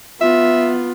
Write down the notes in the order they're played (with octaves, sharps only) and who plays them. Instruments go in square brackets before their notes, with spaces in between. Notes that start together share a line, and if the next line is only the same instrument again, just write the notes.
[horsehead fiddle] B3 F4 [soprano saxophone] E5